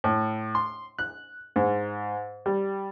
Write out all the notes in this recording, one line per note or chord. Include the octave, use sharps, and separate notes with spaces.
A2
C6
F#6
G#2
G3